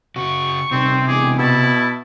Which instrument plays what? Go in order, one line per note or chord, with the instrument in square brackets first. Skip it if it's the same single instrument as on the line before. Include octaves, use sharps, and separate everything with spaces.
[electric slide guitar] C#3 F#4 [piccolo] C#6
[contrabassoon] D#1 [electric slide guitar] C3 [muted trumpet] C4
[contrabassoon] E1 [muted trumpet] G#4 [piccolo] D6
[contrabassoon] B2 [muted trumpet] E4 [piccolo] A5